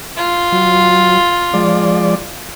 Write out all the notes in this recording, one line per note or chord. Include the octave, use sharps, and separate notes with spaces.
F4
F#3
F3 G#3 D5